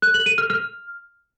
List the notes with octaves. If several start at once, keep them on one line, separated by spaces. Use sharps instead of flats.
F#6
F#7
D#7
F6
F6